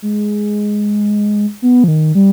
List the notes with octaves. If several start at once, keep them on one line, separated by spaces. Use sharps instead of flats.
G#3
B3
F3
D#3
G3